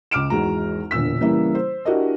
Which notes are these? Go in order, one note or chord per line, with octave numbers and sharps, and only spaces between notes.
C#2 D6 F6 D7 E7
G#1 E2 G#3 F#4 A#5
E1 D2 A#2 E6 B6
C#3 E3 G3 A#3 E4
C5
D4 E4 F#4 G4 A#4 D#5